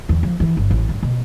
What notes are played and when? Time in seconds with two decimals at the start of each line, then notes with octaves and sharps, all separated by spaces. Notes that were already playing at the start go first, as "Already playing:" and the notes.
0.09 E2
0.23 F3
0.40 E3
0.57 G1
0.70 A1
0.89 G2
1.03 B2